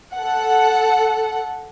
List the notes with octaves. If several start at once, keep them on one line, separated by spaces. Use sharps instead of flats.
A4 F#5